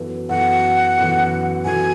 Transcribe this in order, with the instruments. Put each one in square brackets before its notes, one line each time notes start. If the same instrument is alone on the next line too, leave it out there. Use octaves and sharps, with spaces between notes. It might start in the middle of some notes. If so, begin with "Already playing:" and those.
Already playing: [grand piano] F#2 E3 B3 F#4 A4
[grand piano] F#2 E3 B3 F#4 A4 [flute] F#5
[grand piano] F#2 E3 B3 F#4 A4
[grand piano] F#2 E3 B3 F#4 A4 [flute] G#5